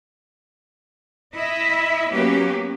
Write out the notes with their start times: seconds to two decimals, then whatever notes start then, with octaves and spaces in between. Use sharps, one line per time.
1.32 E4 D#5 E5
2.10 F#3 A#3 B3 C#4 G4